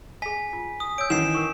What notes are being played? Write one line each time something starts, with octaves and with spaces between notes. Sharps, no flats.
G#4 E5 G#5 B6
F4
D#6
C#5 E6 G6 D7
D#3 E3 C#4 D#4 F#5 C7 E7
A#4 C#6